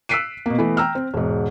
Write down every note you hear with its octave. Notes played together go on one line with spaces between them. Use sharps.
E6 F#6 B6 C7 D7 D#7
B2 A#3
E3 A3 B3
G5 A#5 E6 F6
C4
E1 G#2